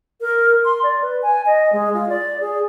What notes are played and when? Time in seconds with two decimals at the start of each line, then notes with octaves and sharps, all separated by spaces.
0.21 A#4
0.65 C6
0.83 D5
1.02 B4
1.22 G#5
1.46 D#5
1.73 G#3
1.94 F4
2.09 D5
2.41 G#4